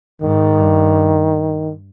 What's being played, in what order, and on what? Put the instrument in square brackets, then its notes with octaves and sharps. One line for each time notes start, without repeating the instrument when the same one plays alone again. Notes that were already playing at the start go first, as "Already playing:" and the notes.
[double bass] G#2 [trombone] D#3
[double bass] G2